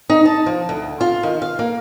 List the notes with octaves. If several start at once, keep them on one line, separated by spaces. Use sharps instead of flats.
D#4
A5
F3
D2
F4
D#3
F5
A#3